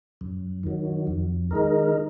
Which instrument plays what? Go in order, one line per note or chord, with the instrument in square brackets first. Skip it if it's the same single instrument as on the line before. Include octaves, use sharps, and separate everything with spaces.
[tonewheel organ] F#2
D#3 F#3
F2
D#3 G#3 D#4 A#4